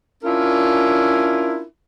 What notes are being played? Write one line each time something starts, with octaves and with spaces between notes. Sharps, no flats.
C#4 D4 E4 F4 A#4